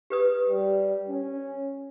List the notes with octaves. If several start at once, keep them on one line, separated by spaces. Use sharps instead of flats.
G4 B4 D#6
G3
C#4